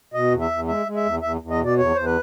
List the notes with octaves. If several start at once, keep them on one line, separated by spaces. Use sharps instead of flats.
B2 D#5
E2
E5
E2
G#3 E5
G#3
E5
E2
E2 E5
E2
D#5
B2 D5
E2 C#5
E2 C5
B4